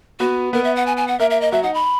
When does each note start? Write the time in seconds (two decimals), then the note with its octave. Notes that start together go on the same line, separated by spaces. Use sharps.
0.20 B3 F#4 B4
0.53 B3 A#4 B4
0.64 E5
0.76 F#5
0.86 G#5
0.97 G#5
1.08 F#5
1.19 A#3 A#4 E5
1.30 E5
1.41 D#5
1.52 F#3 F#4 E5
1.63 D#4 F#5
1.74 B5